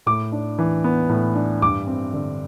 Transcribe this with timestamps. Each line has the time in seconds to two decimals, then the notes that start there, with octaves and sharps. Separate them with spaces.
0.06 A2 D6
0.32 D4
0.59 E3
0.84 B3
1.09 A2
1.35 D4
1.62 G2 D6
1.87 C4
2.13 D3